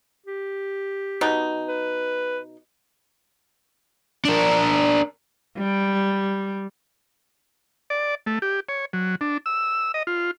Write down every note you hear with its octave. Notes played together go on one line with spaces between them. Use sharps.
G4
B2 D#4
B4
D4 A#4
G3
D5
A3
G4
C#5
F#3
D4
E6
D#5
F4